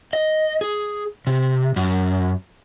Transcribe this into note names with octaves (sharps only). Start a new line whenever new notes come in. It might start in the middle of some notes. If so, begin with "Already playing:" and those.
D#5
G#4
C3
F#2